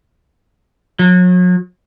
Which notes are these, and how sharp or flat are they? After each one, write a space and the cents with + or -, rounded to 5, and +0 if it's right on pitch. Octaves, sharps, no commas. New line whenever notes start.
F#3 -40